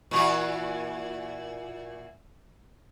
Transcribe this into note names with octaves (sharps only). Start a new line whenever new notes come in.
A#2 E3 F#4